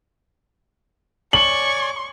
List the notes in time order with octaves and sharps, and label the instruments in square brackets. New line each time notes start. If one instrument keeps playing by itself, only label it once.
[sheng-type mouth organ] C#5 D5 G#5 [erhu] C#6 [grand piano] F#7